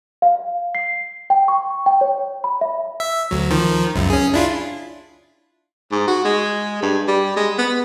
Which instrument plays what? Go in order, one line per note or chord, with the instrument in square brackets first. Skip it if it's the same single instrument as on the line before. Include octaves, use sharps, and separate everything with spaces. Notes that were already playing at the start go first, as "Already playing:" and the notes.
[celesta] F5
C7
G5
C#6
G5
C#5
B5
E5
[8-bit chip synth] E5
D2 F#3
D#3 F3
C#2 F#2
C#4 G#4
D4 E4 F4
[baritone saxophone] G#2
F#4
G#3
G2
G3
G#3
B3